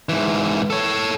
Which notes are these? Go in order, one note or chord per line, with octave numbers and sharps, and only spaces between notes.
G#2 E3
A4 C#5